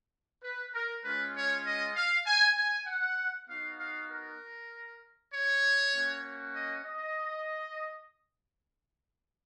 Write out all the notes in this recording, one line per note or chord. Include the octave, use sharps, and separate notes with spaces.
B4
A#4
G#3 C#4 F4 B4
C#5
D#5
F5
G#5
G#5
F#5
B3 D#4 F#4 F5
F5
A#4
C#5
A#3 C#4 F#4
D#5
D#5